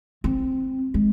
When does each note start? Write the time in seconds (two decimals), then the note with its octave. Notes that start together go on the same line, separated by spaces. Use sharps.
0.24 C4
0.94 G#3